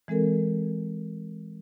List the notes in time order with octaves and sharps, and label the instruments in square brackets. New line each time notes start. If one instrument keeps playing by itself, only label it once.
[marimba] E3 G#3 C4 A4 A#4